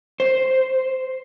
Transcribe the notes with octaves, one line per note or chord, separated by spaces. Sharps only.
C5